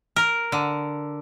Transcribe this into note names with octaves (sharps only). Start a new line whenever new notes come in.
A#4
D3